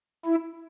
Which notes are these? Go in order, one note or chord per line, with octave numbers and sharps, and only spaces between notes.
E4